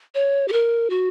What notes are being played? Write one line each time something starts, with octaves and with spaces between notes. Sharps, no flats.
C#5
G4
A#4
F#4